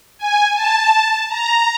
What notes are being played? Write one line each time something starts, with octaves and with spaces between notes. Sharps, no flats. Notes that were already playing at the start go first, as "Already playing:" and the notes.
G#5
A5
A#5